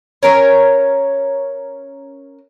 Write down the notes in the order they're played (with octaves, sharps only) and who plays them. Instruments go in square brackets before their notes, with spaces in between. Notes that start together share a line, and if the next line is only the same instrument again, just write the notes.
[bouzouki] C#4 A#4 C#5